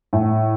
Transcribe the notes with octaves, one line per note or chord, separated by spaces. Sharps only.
A2